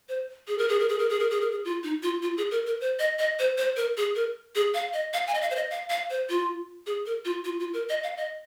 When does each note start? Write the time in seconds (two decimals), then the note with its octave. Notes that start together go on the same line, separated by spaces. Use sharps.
0.09 C5
0.48 G#4
0.58 A#4
0.69 G#4
0.80 A#4
0.89 G#4
0.99 A#4
1.09 G#4
1.19 A#4
1.30 G#4
1.41 A#4
1.51 G#4
1.65 F4
1.83 D#4
2.03 F4
2.23 F4
2.37 G#4
2.51 A#4
2.66 A#4
2.81 C5
2.99 D#5
3.19 D#5
3.39 C5
3.58 C5
3.77 A#4
3.97 G#4
4.16 A#4
4.55 G#4
4.74 F5
4.93 D#5
5.13 F5
5.27 G#5
5.35 D#5
5.41 F5
5.51 C5
5.56 D#5
5.71 F5
5.90 F5
6.10 C5
6.30 F4
6.87 G#4
7.06 A#4
7.25 F4
7.44 F4
7.59 F4
7.73 A#4
7.89 D#5
8.03 F5
8.17 D#5